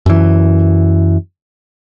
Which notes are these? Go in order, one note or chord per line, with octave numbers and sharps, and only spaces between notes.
F#2 E3